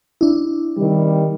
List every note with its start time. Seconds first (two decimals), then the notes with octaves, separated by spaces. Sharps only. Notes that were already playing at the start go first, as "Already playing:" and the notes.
0.21 D4 E4
0.76 C3 D#3 G3